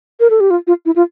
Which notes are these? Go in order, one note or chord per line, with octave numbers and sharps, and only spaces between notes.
A#4
A4
G4
F4
F4
E4
F4